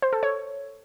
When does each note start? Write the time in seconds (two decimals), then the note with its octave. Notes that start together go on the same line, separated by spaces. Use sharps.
0.02 C5
0.13 A4
0.23 C#5